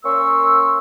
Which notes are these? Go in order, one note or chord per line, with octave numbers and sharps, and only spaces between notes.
A#3 C#4 A#4 C6 C#6 E6